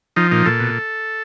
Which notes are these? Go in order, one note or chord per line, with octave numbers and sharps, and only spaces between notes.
F3 D#4
A#2 D#4
A#2 A4
B2